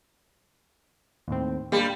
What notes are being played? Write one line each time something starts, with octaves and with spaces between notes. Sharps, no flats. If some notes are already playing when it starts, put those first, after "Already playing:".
D#2 A2 C4
G3 A#3 D4 F4